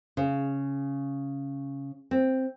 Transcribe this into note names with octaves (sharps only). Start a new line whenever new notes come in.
C#3
C4